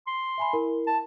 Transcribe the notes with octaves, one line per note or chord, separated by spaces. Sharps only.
C6
E5 G#5 B5
E4 A#4
A5